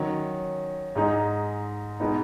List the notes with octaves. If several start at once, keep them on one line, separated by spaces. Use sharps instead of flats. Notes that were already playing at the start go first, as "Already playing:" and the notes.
Already playing: D#3 F#3 C#4
G#2 G#3 D#4
B2 G#3 B3 D#4